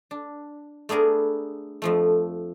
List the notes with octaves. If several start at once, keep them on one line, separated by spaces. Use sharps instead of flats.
D4
A3 B3 D4 G#4 A#4
F2 F3 A3